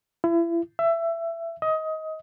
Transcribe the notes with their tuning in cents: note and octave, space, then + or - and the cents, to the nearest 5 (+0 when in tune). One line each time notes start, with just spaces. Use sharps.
E4 +35
E5 +20
D#5 +20